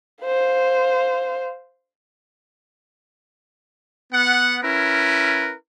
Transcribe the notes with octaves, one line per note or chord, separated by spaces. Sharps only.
C5 F5
B3 F#5
C#4 E4 A#4 B4